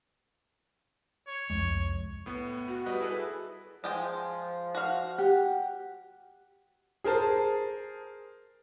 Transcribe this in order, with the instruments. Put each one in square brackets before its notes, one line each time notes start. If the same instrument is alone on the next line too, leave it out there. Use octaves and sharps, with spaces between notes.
[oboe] C#5
[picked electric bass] C2 G#3 [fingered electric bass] F2
[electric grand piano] A2 B3
[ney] F#4
[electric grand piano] G3 B4 D#5
[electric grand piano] E4 A4 B4 [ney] G#4
[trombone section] F3 [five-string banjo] G#3 G5 G#5
[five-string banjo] F#4 F5
[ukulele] G4 [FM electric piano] F#5
[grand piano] G#4 A#4 C5 A5